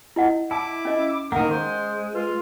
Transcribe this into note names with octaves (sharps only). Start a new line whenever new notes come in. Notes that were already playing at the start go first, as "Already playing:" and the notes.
E4 D#5 F#5
E4 A5 D6
C#4 D#5
D#3 A#3 A#4 F#5
G#3 C5
F4 B4